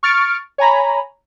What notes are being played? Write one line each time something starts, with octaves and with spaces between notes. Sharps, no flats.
C#6 F6 A6 C#7 D7
C#5 G#5 A#5 B5